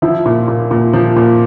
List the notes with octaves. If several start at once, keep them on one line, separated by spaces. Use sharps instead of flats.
F3 E4
A#2
A#2
A#2
F3
A#2